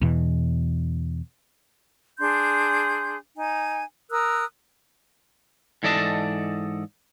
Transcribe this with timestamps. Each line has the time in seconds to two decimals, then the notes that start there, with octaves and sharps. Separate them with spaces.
0.02 E2 B2 E3
2.18 D4 G#4 C6 G6
3.37 D#4 G#5
4.10 A#4 D#6 E6 F#6
5.83 G#2 E3 A4 D5 D#5 A5